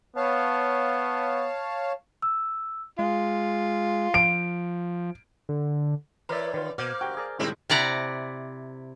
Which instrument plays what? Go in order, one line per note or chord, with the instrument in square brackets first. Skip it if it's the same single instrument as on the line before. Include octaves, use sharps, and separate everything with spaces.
[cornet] B3 [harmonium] C#5 F5 A5
[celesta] E6
[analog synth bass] G#3 [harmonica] F4
[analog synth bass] F3 [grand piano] D7
[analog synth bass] D3
[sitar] E3 [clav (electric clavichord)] A#4 E5 [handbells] B4 C#5 D5
[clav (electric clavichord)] D#3 F4
[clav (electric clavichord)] B2 [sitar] A#3 [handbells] C5 D6 F6
[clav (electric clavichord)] F#4 G4 [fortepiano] G5
[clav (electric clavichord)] G#4 A#4 D5
[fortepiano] A2 G#3 [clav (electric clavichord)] D#3 G3 [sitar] A#3 C4 E4
[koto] C3 E4 D5 F#5 A#5